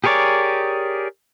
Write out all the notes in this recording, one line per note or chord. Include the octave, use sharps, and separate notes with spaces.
G4 G#4 A#4 C#5 D5